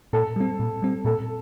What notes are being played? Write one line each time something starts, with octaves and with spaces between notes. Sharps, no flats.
A#2 A4
G3 C4
A#2
G3 C4
A#2 A4